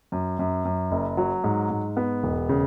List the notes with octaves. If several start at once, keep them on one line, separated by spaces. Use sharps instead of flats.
F#2
F#2
F#2
F#1
F#3
G#2
G#2
B3
E1
C#3